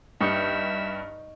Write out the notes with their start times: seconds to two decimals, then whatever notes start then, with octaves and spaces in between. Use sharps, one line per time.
0.21 G2 D#4 E5 C#6 G6